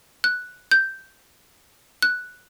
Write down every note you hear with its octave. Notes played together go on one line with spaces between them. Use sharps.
F#6
G6
F#6